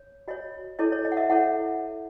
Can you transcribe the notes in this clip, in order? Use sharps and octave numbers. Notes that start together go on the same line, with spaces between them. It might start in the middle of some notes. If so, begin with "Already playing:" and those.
Already playing: C#5
F#4 C#5 D#5
E4 A4 C#5 D#5
C#5
D#5
F#5
E5
E4 A4 C#5 F#5